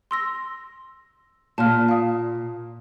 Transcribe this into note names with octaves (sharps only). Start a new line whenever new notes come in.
C6 E6 A#6
A#2 A5 F6
F5 D#6